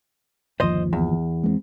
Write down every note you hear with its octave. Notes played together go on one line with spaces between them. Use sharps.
G1 D#2 F3 C5 D#5
E2
G#3 A#3 C4